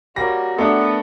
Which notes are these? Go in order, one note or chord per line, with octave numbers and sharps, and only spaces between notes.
G3 A#3 F#4 C#5 A#6
A3 B3 D4 A4